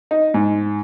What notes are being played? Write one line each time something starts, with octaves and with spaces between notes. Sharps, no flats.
D#4
G#2